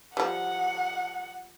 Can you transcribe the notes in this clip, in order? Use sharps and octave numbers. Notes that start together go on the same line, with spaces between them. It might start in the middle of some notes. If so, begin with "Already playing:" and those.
F3 G3 F#5